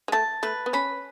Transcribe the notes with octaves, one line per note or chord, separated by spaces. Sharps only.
G#3
A3 A5
A3 B4
B3
C#4 B5